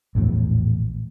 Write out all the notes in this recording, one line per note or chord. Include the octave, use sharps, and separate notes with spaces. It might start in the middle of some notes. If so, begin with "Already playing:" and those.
A#1 E2 A2